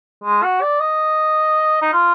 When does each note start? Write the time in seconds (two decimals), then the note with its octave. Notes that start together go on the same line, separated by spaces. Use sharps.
0.24 G#3
0.43 F#4
0.61 D5
0.80 D#5
1.82 D#4
1.93 F4